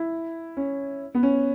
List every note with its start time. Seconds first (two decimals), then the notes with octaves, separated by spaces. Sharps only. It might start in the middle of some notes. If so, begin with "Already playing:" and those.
Already playing: E4
0.57 C#4
1.15 B3
1.23 C#4